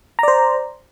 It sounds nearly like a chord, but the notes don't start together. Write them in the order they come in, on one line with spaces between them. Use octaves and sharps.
A#5 D5 C5